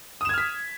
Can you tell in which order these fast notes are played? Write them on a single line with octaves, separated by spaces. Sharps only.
D#6 E7 G#6 F6 B6